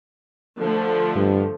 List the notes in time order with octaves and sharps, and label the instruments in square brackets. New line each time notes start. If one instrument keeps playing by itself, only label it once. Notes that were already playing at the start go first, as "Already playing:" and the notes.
[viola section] D3 F3 A3
[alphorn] G2